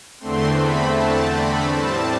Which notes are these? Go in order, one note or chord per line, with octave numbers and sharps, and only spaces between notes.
E2 D3 A3 C4 C6
B5
A5
B5
A2 G3 C4 A5